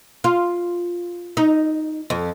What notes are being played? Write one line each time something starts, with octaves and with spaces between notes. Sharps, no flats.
F4
D#4
F2